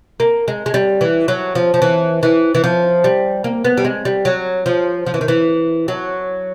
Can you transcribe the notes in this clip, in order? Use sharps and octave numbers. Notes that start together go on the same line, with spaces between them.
A#3
G#3
G#3
G3
E3
F#3
F3
F3
E3
E3
E3
F3
G3
A#3
B3
G3
G#3
G3
F#3
F3
F3
E3
D#3
E3
F#3